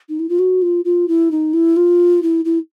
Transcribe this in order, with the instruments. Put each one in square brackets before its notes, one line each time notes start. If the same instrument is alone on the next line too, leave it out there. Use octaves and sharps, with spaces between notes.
[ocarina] D#4
E4
F4
F#4
F4
F4
E4
D#4
E4
F4
E4
E4